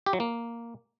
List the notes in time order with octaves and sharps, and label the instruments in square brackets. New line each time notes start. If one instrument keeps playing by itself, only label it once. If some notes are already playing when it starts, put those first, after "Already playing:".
[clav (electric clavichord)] G4
F#3
A#3